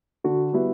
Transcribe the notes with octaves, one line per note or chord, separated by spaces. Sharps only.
D3 F#4
G3 B3 E4